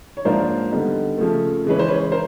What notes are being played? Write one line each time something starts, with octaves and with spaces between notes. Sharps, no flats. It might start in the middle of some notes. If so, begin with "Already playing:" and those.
C#5
G#2 F3 A#3 D4 F4 A#4 C5
D3 G3 B3 D#4
C#3 F3 A3
C#3 E3 G#3 C#4 B4
C5
B4 C#5
A#4 C5